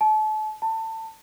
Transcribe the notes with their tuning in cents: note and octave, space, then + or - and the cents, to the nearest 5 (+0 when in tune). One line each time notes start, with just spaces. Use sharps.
A5 -35
A5 +25